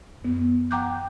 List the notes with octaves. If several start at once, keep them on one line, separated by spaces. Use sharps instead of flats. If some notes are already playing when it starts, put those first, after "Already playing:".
F#2 B3
F#5 G5 A#5 D6 F#6 G6